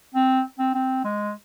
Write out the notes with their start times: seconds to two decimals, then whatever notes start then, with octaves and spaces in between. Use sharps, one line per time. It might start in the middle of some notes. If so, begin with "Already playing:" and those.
0.14 C4
0.59 C4
0.74 C4
1.04 G#3